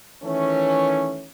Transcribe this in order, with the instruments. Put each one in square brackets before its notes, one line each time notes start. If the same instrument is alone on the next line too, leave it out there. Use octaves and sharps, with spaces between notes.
[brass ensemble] D#3 E3 A3 C#4